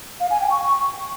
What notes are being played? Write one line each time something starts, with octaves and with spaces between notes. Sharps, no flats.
F5
G#5
G5
C#6